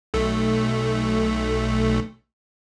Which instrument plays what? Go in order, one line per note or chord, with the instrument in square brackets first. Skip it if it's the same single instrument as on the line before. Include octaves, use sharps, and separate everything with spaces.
[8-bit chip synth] B1 A3